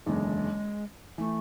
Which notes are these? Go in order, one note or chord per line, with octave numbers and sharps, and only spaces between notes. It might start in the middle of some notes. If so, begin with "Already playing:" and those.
F#1 E2 D3 G#3
E3 A3